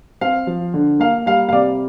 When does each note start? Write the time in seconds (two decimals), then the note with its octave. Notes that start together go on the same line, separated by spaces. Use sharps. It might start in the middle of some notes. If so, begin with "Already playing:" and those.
0.21 C4 F5
0.47 F3
0.74 D3
1.00 A#3 F5
1.26 G3 F5
1.49 F5
1.52 C3 D5